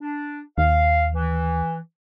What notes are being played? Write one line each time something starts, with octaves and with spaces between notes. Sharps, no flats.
D4
D#2 F5
E3